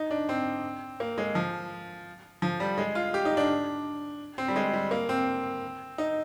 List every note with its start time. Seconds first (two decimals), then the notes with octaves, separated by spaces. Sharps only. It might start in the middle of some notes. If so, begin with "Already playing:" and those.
Already playing: D#4
0.11 D4
0.29 C4
1.00 A#3
1.18 G#3
1.35 F3
2.42 F3
2.60 G3
2.78 G#3
2.95 F4
3.14 G4
3.25 D#4
3.37 D4
4.38 C4
4.48 G3
4.56 G#3
4.74 G3
4.91 A#3
5.09 C4
5.98 D#4